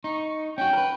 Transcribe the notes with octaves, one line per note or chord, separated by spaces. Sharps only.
D#4 C#6
C#4 F#4 G5
A#4 B4